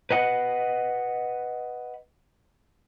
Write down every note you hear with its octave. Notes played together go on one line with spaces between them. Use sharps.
B4 D#5 F#5